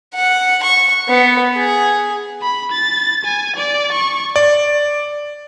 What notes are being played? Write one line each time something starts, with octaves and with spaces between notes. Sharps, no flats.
F#5
C#6
B3
G#4
B5
A6
G#5
D5
C#6
D5